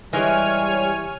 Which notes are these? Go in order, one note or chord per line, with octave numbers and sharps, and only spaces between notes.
E3 G3 G#3 C#5 G#5 F6